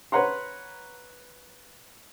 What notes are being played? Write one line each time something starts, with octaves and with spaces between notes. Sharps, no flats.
B4 C#5 F#5 A#5 C6